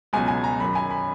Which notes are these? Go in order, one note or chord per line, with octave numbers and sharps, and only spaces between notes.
C#2 B2 F#3 G#5
G#5
A#5
F#2 D#3 F#3 B5
G#5
B5